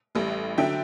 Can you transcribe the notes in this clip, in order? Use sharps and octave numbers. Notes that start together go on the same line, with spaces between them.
A1 A2 G3
D3 F#3 E5 G5